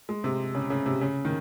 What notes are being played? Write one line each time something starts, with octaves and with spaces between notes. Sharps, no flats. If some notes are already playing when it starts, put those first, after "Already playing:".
G#3
C3
C#3
C#3
C3
C#3
D#3